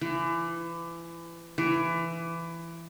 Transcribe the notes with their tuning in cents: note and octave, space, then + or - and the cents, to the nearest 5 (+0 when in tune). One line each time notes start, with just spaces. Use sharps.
E3 +30
E3 +20